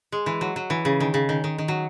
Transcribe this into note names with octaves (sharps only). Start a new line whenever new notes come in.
G#3
E3
F#3
F#3
E3
C#3
D#3
C#3
D#3
D#3
D#3
F#3